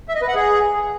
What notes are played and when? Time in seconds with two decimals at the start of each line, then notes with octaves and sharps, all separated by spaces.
0.08 E5
0.15 D#5
0.22 B4
0.28 F#5
0.35 G#4